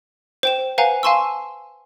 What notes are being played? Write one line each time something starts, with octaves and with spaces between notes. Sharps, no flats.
C5 G5 E7
B4 C5 F5 F#5 G#5 A#5
F5 G#5 A5 C6 C#6 E6